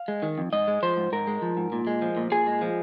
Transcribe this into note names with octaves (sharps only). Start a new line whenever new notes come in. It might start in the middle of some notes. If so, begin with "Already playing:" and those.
Already playing: F5
G#3
D#3
F2
G#2 D#5
G#3
F3 C5
G#2
G#2 A#4
G#3
F3
G#2
A#2
G#3
F3
A#2
A#2 G#4
G#3
F3